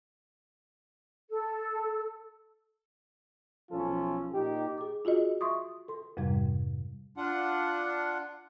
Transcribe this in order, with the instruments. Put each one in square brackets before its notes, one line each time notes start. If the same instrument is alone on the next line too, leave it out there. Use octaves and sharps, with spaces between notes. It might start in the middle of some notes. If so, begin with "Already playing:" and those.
[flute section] A4
[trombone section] B1 F3 C#4 F4 A4
A#2 D#4 G4
[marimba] G#4 D6
F4 F#4 G#4 D#5
E5 C6 C#6 D#6
A4 C6
F2 G#2 C3 G3
[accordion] D4 F4 F#5